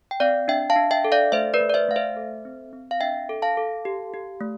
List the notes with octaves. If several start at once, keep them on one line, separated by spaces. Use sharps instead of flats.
G5
C4 D5 F5
D4 E5 G5
F5 A5
D4
E5 G5
A4
D5 F5
A3 C5 E5
B4 D5
A3
D5
C5 E5
A3 F5
C5 E5
A4
C4
C4
F5
D4 E5 G5
A4
F5 A5
A4
G4
G4
A3